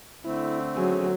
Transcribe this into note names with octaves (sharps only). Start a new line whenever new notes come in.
D3 A3 C4 E4
F#3 C#4 G#4